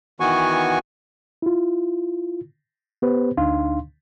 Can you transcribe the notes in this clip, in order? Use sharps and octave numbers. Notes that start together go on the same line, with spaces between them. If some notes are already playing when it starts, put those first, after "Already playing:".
D#3 E3 B3 F#4 G#5 C#6
E4 F4
B3 G4 B4 C5
D2 D4 D#4 F5 C6